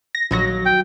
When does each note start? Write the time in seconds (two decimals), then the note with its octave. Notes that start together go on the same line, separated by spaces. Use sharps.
0.15 A#6
0.31 A#1 D#2 F#3 F#4 A#6
0.66 G5